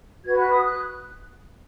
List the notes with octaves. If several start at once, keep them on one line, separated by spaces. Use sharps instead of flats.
F#4 B4 G#6
F#6
D#6
F#6